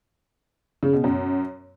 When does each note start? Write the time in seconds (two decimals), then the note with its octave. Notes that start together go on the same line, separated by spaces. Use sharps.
0.83 C#3
0.93 B2
1.04 F#2